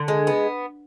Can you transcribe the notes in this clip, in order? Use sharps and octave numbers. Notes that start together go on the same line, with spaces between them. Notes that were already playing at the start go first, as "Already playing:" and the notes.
Already playing: D3
G#3
B3